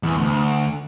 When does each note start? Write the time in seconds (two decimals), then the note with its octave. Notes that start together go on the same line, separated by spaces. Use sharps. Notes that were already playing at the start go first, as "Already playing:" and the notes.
0.03 E2
0.17 D2